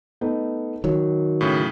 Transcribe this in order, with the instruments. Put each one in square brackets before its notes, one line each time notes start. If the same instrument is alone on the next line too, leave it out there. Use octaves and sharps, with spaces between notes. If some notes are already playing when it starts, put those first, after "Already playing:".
[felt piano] A3 B3 D#4
[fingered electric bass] D#3 F#3 [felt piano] C#5
[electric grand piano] A2 C#3